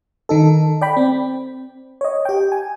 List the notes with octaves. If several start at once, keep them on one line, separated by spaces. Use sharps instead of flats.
D#3 D#4 A4
D5 G5 B5
C4
C#5 D#5
G4 G5
G#5